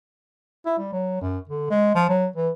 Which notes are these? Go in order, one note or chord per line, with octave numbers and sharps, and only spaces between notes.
E4
G3
F#3
F#2
D3
G#3
F3
F#3
E3